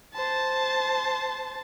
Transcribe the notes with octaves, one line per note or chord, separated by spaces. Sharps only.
C5 A5